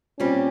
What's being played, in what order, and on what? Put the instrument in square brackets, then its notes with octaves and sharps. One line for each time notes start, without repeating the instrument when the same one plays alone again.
[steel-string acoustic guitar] A#2 G3 C4 G4 [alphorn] C#4